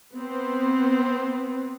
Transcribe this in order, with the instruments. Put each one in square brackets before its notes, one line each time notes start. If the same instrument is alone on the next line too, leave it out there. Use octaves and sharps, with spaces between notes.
[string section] B3 C4